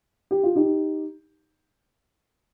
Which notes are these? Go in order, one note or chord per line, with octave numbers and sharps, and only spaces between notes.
G4
F4
D#4 G4